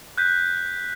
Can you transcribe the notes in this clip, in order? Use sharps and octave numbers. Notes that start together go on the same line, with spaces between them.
F#6 G6 B6